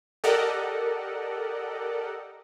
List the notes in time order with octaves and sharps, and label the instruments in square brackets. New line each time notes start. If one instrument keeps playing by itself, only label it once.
[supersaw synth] G4 A4 A#4 D5 D#5 F#5